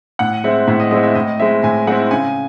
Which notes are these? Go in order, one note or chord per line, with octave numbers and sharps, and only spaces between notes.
A2 F#5
G#3 C4 E4 E5
A2 E5
D#5
G#3 C4 E4 D#5
E5
A2 D#5
G#3 C4 E4 E5
A2 G#5
G#3 C4 E4 F#5
C#3 G#5